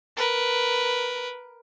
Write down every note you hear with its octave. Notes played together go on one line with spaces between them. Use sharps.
A#4 B4